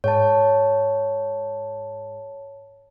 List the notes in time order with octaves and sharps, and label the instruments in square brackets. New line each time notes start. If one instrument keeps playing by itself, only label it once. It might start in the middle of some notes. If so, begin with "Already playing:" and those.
[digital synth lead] G#2 [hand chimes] C#5 G5 A5